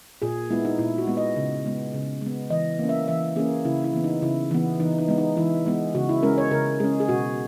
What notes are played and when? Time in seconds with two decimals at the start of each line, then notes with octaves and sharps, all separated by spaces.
0.22 A#2 G#4
0.50 G#3 B3 E4
0.65 D#4
0.78 A#2 E4
0.98 F#4
1.07 G#3 B3
1.17 D#5
1.36 C#3
1.65 G#3 B3
1.94 C#3
2.22 G#3 B3
2.50 E3 D#5
2.79 A#3 C#4
2.89 E5
3.08 E3 E5
3.36 A#3 C#4 G#4
3.65 C#3 E4
3.84 E4
3.93 E3 B3
4.04 D#4
4.22 C#3 E4
4.51 E3 B3
4.80 E3 D#4
4.98 D#4
5.08 G#3 B3
5.18 D#4
5.37 E3 E4
5.66 G#3 B3
5.95 C#3 F#4
6.09 E4
6.23 G#3 C#4 A#4
6.38 C#5
6.51 C#3 A#4
6.80 G#3 C#4 G#4
7.00 G#4
7.08 B2 F#4